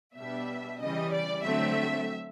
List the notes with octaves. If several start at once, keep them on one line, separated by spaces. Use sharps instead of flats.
B2 G3 B3 D4 E5
C#3 E3 G3 D#5
D5
D3 F#3 A3 C4 E5